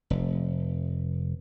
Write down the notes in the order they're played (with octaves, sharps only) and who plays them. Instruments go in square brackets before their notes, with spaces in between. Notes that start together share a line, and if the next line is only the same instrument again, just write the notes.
[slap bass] F1